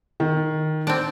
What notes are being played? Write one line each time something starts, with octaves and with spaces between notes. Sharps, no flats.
D#3
C4 D4